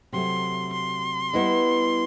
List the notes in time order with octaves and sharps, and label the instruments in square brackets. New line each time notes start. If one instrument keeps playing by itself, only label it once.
[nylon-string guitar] C3 F#3 A3 [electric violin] C6
[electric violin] C6
[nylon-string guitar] G3 B3 E4 B4 D#5